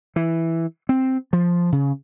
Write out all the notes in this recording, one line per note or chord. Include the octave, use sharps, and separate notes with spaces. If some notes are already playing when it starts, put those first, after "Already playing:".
E3
C4
F3
C#3